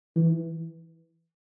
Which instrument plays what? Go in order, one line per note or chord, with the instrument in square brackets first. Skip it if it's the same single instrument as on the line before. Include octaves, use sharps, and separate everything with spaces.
[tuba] E3